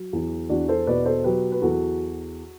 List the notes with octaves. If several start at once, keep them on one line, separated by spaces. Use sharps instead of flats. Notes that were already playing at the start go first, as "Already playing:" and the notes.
Already playing: F#3
E2
E2 D4 F#4
A4 C5
B2 B4 D5
A4 C5
F#3 G4 B4
B4
E2 F#4 A4